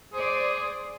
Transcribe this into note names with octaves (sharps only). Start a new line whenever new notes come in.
G#4 C5 D5